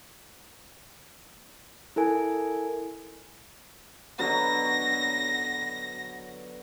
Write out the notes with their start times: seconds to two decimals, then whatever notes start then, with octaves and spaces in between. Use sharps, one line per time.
1.96 E4 A4 A#4 G#5
4.19 B2 D3 F#3 A#6